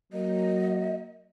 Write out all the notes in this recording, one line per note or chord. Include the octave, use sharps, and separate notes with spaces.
F#3 A#3 D#5